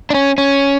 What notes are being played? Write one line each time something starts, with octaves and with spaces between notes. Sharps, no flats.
D4
C#4
C#4